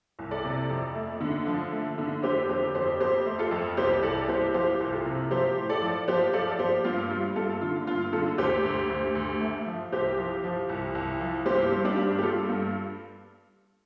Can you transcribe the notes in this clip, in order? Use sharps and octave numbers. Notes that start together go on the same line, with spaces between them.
C2
A4 D5
C3
F2
A3
D3
F3
A3
D3
F2 G4 C5
F2 G4 C5
F2 G4 C5
F2 G4 C5
A3
F4 A4
F2
C2 G4 C5
C2 A4 D5
C2 G4 C5
F3 G4 C5
C2
F4 A4
C3
F3 G4 C5
A2
A4 D5
F3
F3 G4 C5
F3 A4 D5
F3 G4 C5
G2 F4
G3 F4
G2 F4 A4
D3 F4
G2 F4
D3 F4 A4
D2 G4 C5
D2
D2
D2
A3
F3
C2 G4 C5
F3
F3
C2
C2
F3
G2 G4 C5
G3
D4 G4
G2
G4
G3 F4 A4
G2